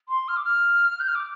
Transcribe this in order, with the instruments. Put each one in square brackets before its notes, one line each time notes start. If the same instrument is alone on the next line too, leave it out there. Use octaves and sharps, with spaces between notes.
[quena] C6
F6
D6
F6
G6
F6
D6